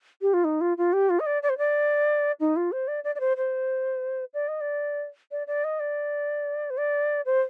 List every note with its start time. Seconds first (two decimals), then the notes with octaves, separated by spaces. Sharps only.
0.22 G4
0.34 F4
0.44 D#4
0.61 F4
0.78 F4
0.93 G4
1.10 F4
1.20 D#5
1.26 D5
1.43 D5
1.49 C5
1.58 D5
2.40 D#4
2.56 F4
2.72 C5
2.88 D5
3.04 D5
3.15 D5
3.20 C5
3.37 C5
4.34 D5
4.48 D#5
4.61 D5
5.31 D5
5.47 D5
5.64 D#5
5.80 D5
6.70 C5
6.78 D5
7.26 C5